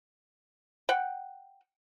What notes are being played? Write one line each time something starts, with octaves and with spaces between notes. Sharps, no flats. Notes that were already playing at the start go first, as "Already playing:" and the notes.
F#5 G5